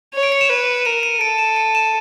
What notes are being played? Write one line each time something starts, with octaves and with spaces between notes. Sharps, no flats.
C#5
D7
C#7
E7
B4
A#4 D#7
D#7
A4 D7
E7
D#7
E7